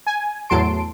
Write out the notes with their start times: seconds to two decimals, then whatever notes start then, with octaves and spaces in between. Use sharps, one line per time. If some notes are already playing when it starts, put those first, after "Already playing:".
0.07 G#5
0.49 E2 A2 F#3 A5 C6 D7